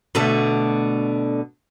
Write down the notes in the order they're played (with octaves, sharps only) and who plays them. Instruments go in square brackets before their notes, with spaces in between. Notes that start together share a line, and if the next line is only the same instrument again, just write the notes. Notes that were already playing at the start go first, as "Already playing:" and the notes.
[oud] B2 D3 A3